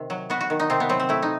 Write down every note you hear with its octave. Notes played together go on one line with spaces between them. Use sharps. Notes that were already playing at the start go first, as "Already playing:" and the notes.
Already playing: C3 D#3
F#3
B3 F#4
F#4
D#3
D#4
C3 C4
B3
F#3 C4
C4
A3 E4
D#4